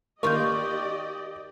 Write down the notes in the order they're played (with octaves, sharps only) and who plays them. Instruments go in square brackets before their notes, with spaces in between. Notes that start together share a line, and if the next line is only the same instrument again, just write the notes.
[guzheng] D#3 F4 [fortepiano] A#3 [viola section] G4 D5 D#5 [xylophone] C#6 G6